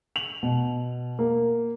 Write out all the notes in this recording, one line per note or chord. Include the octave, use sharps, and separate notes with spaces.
F7 F#7
B2
A#3